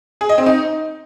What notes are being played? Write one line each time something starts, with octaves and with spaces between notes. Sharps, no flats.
G#4
D#5
C4
D#4